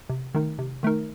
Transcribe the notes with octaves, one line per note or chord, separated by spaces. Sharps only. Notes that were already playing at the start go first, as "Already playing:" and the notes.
C3
D#3 A3 D#4 A#4
C3
D#3 A3 D#4 A#4